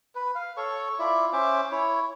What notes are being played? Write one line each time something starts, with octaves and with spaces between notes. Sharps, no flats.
B4
F5
A4 C#5 C#6
E4 F4 D5 E5
C#4 C5 E5 D6
E4 C#5